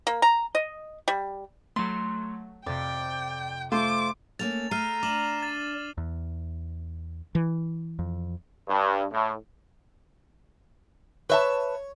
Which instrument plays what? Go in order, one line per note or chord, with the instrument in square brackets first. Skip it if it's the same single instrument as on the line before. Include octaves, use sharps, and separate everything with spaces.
[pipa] A#3
A#5
D#5
G3
[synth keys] F#3 A3 [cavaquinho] C6
[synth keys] F2 C3 [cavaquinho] D5 [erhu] G5
[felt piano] A3 [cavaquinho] F4 C5 [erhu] D6
[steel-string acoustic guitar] A3 A#3 C#4 [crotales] A6 F7
[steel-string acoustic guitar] A3 [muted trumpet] A#5 [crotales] F6 C7 D#7
[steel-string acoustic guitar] D4 [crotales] D6 E7 F#7
[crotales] A6
[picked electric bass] E2
[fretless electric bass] E3
[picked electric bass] F2
[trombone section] G2
A2
[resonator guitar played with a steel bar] B4 E5 A5 [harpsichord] C#5